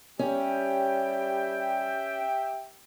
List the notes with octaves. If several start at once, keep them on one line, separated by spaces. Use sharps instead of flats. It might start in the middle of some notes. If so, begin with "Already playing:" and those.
G3 C#4 G4 E5 G5